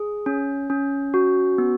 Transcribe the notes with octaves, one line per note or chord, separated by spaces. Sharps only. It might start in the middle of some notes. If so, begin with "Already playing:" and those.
Already playing: G#4
C#4
C#4
F#4
B3